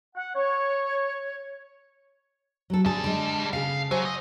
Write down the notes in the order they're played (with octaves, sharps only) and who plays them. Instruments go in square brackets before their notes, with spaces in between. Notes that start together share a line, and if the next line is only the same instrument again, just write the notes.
[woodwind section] F#5
C#5
[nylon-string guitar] F#3 A4
[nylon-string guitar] D3 A3 G#4 [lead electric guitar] G3 A5
[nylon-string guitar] D3 G#3
[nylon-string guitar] C#3 A4 [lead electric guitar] F5
[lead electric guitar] F#3 [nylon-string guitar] C5 F#5 G#5
[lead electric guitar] D#5